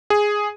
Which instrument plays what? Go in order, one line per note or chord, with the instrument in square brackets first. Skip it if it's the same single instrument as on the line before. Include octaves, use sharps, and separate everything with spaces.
[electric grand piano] G#4